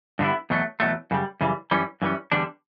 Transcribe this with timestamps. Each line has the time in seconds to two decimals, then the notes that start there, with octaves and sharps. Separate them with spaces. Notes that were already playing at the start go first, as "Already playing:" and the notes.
0.19 G2 D3 G3 B3 E4
0.50 E2 B2 F#3 A3
0.80 E2 B2 F#3 A3
1.11 F#2 C#3 G3
1.41 F#2 C#3 E3 G3
1.71 F#2 E3 G3 C#4
2.02 F#2 E3 G3 C#4
2.32 E2 D3 G3 D4